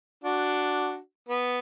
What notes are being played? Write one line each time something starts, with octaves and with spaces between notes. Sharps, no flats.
D4 F#4
B3